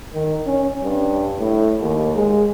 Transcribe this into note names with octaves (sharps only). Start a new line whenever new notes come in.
D#3
C#4
G2
A2
D#2
G#3